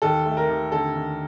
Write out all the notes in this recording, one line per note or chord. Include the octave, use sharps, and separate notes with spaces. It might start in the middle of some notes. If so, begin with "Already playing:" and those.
D#2 A4
A3
A#4
D#2
D3 A4
D#2